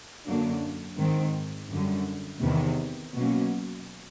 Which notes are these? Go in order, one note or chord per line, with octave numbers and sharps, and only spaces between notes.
F#2 D3 F#3 A#3 D4
G#2 D#3 G#3 C4
F#2 D3 G3
E2 C3 D#3
B2 F#3 A#3 C#4